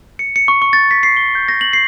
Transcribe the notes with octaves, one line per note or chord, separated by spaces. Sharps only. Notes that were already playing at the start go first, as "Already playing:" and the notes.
C#7
C#7
C#6
C#6
A6
B6
C7
G7
G6
A#6
F#7
C7